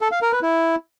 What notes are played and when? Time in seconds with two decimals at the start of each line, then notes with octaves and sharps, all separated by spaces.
0.01 A4
0.12 F5
0.22 A#4
0.32 B4
0.42 E4